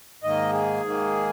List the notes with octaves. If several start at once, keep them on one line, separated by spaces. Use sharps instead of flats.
G#2 D#3 A#3 D#5
G#4
G#2 D#3 A#3